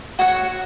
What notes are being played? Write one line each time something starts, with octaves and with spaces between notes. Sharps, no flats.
F#4 C#5 F#5